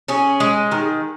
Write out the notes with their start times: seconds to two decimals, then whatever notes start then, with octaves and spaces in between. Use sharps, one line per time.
0.08 C#4 G#4
0.40 G#3
0.71 D#3